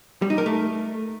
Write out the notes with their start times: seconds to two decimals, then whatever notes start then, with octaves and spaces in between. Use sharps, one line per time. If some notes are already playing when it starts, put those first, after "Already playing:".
0.22 G3
0.30 D#4
0.38 A#4
0.46 A3